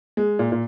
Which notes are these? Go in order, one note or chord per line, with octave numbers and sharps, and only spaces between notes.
G#3
A#2
A#2